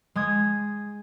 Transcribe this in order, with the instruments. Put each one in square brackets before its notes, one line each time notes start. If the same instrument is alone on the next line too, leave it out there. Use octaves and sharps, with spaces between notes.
[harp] G#3 D#6 G#6